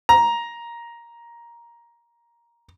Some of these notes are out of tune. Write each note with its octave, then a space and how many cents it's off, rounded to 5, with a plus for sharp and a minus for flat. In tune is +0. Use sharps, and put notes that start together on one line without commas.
A#5 +10